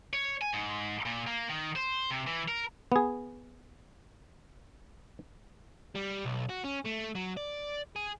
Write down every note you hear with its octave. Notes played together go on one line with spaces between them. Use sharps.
C#5
G#5
G#2
A#2
A#3
D#3
C5
C3
E3
A#4
B3 G#4
G3
B1
F#4
C#4
A3
F#3
D5
G#4